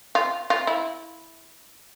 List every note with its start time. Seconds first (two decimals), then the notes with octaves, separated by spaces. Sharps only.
0.15 F4
0.50 F4
0.67 E4